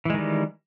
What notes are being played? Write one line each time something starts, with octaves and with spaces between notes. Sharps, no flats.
D#3 E3 G3 G#3